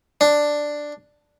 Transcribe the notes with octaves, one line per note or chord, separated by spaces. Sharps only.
D4